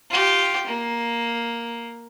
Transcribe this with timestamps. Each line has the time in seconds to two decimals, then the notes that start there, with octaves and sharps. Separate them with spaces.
0.10 F4 G4
0.67 A#3